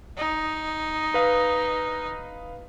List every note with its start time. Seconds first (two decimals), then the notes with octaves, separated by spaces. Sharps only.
0.17 D#4
1.14 B4 F5